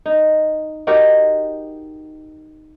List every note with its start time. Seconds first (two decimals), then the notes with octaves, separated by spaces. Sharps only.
0.06 D#4
0.87 D#4 F#4 G4 A#4